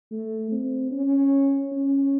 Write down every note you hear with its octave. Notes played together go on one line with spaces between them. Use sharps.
A3
C4
C#4
C#4